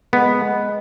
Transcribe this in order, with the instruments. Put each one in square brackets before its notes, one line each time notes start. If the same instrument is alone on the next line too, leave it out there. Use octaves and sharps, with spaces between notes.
[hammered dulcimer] G#3 [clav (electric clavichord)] B3